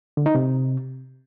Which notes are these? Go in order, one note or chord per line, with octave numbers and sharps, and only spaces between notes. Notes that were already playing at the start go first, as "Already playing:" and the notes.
D3
D#4
C3